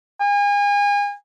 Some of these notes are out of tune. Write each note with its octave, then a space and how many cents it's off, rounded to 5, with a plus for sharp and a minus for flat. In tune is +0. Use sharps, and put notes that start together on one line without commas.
G#5 -35